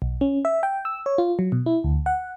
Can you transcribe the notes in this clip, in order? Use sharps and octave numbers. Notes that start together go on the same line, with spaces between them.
B1
C#4
E5
G5
E6
C#5
F4
F#3
B2
E4
D2
F#5